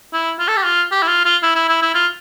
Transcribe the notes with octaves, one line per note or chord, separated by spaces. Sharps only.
E4
F4
A4
G4
F4
G4
E4
F4
F4
E4
E4
E4
E4
F4